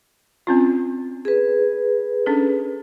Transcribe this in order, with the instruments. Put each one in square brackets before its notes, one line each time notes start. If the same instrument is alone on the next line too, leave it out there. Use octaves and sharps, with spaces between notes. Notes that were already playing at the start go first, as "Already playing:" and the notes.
[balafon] C4 C#4 F4
[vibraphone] G#4 B4
[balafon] C#4 D4 A4